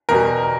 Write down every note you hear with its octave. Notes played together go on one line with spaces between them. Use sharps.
E2 B2 G3 A#4